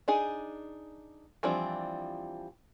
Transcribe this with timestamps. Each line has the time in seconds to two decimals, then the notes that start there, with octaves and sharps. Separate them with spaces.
0.08 D4 D#4 G#4
1.43 E3 F3 G3 C4 D4